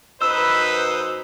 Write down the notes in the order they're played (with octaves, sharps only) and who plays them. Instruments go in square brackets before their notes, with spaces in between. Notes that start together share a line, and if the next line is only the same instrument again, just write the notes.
[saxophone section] F#2 D#4 C5 [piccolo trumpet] B4 [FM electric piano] E6